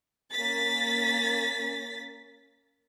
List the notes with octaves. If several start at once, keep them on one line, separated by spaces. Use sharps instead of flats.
A#3 C#4 A6 B6